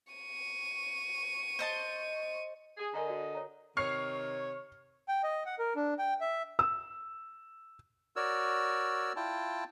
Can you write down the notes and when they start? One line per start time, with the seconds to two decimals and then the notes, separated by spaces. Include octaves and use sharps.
0.13 C#6 D#7
1.59 C5 D#5 A5
2.77 G#4
2.94 D3 A#4 D#5 G#5 A#5
3.08 F#4 D5
3.35 C#5 A#5
3.77 C3 D#3 C#5 C#6 F6 C7
5.08 G5
5.23 D#5
5.46 F#5
5.59 A#4
5.76 D4
5.99 G5
6.21 E5
6.59 E6
8.16 F#4 A#4 C#5 D5 E6
9.16 E4 F4 G5 A5